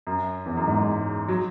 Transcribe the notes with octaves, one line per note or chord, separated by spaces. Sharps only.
F#2
E2
F#2
G#2
F#3